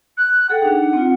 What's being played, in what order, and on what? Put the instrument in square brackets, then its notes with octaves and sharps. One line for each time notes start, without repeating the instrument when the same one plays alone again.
[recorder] F#6
[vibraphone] G#4 A4 G5 [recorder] F#5
[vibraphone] D4 D#4
C4 F4